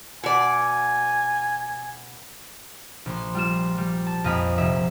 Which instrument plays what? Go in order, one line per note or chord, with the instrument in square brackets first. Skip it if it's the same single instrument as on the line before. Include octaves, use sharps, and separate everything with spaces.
[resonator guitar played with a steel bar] B2 D5 [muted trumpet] G#5
[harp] A#1 C6
G3 F4 E7
G3
A5
A#1 F2 D#5 F5 G#5 B5
F1 E5